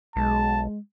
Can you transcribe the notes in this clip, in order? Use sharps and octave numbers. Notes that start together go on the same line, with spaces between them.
B1 G#3 A5